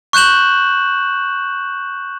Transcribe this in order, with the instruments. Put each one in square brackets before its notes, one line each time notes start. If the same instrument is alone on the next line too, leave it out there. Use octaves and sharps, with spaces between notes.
[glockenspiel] C#6 F#6 G6 E7 F#7